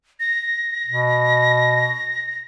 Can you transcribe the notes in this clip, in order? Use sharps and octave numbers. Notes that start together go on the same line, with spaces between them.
A#6
B2